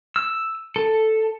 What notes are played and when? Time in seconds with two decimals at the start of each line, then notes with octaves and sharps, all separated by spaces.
0.16 E6
0.76 A4